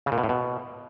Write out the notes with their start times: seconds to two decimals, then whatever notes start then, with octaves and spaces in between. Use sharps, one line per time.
0.06 C#3
0.12 A#2
0.18 B2
0.24 A2
0.29 B2